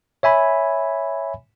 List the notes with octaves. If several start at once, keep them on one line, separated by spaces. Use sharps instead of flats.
C#5 E5 G#5 B5